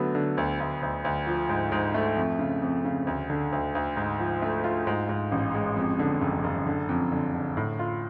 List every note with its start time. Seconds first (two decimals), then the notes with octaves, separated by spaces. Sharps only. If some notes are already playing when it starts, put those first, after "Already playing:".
Already playing: D3 F#3 A3 B3
0.15 D3
0.37 D2
0.60 D2
0.82 D2
1.04 D2
1.27 F3
1.49 G#2
1.72 G#2
1.94 A3
2.17 F2
2.39 C#3
2.62 F2
2.85 C#3
3.07 D2
3.30 D3
3.52 D2
3.75 D2
3.97 G#2
4.19 F3
4.42 A3
4.64 F4
4.87 G#2
5.09 G#2
5.32 A1
5.54 G#3
5.76 F2
5.99 D3
6.21 F#1
6.44 F#1
6.67 D3
6.89 F2
7.12 D3
7.34 D3
7.57 A2
7.79 F4